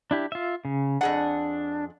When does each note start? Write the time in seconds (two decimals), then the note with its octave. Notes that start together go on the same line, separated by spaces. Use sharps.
0.11 D4 E4 G4
0.32 F4 E5
0.65 C#3
1.01 F2 D4 G#4 F#5